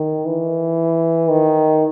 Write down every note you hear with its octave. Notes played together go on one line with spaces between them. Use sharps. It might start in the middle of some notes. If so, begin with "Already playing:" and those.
Already playing: D#3
E3
D#3